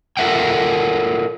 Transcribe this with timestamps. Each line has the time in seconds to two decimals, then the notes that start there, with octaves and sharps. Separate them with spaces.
0.17 F4 A4 A#4 E5 F#5 G5